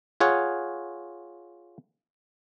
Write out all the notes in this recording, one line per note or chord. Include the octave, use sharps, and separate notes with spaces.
F4 G#4 C#5 F#5